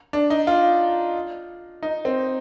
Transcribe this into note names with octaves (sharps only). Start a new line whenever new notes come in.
D4
D#4
F4
D#4
C4